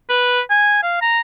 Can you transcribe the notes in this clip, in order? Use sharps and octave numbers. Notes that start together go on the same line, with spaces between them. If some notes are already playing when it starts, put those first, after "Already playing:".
B4
G#5
F5
A#5